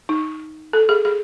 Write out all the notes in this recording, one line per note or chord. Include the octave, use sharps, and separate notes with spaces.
D#4
A4
G#4
G#4